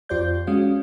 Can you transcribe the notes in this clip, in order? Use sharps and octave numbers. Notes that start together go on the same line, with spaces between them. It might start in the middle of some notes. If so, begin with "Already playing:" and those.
F2 F4 G4 C5 D5 G6
G#3 C#4 F#4 F5